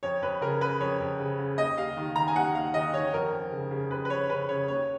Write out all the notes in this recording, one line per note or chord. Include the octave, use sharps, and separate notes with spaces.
F2 C#5
F2 B4
C#3 A#4
C#3 B4
F2 C#5
F2
C#3
C#3
D#2 D#5
D#2 F5
D#3
D#3 A#5
G#5
D#2 F#5
D#2 F5
D#3 D#5
D#3 C#5
F2 A#4
F2
C#3
C#3
F2 B4
B4
F2 C#5
C#3 B4
C#3 C#5
D#2 C#5